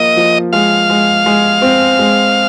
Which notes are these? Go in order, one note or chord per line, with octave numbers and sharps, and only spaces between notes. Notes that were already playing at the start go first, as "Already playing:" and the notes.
Already playing: F3 A#3 D#5
F3
G#3 F5
G#3
G#3
C4
G#3